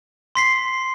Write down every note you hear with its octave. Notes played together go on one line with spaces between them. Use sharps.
C6 B6 C7